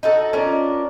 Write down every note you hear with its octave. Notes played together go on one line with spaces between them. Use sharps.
D#4 F#4 A4
C#4 D4 F4 A#4